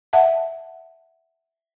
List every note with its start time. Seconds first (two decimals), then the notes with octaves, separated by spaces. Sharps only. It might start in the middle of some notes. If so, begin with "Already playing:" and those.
0.13 E5 F#5 A5